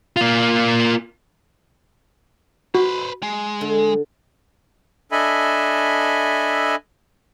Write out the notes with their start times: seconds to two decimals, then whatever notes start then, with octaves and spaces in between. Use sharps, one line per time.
0.17 A#3 F4
2.75 F#4 B4 C5
3.23 G#3
3.61 D3
5.12 D4 A4 D#5 E5 G#5 B5